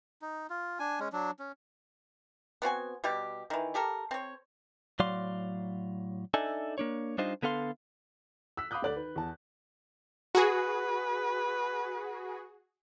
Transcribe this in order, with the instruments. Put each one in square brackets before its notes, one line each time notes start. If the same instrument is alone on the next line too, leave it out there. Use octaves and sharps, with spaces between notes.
[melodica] D#4
F4
D4 G#5
G#3 C#4
F#3 D4
C#4
[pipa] B3 C4 F#4 G#5
B2 G3 G4
D#3 E3
G4 A4 A#4
C4 C#5
[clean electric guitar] A2 F#3 D5 F5 C6
D4 D#4 A4 D5 E5 G#5
A#3 D4 C#5
G3 D4 D#4 F4 C5 D#5
D3 B3 A4 F5 C6
[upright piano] E6 F#6 B6
F5 B5 D6 D#6 F#6 G6
D2 D3 D5 F#6 F#7
D#3 B4
E2 A5
[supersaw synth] F#4 G#4 [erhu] B4